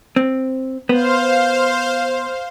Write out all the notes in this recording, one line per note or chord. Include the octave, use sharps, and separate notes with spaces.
C4
B3 C5 F5